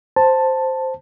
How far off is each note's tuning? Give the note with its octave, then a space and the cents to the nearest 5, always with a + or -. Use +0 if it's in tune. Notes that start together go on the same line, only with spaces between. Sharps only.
C5 +0 A5 +5